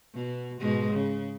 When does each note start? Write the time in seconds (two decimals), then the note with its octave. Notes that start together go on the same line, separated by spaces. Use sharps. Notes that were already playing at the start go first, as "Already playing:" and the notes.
0.14 B2
0.60 G#2 B2 G#3
0.93 C#3